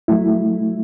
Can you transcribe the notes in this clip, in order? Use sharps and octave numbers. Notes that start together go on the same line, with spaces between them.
F#3 A3 E4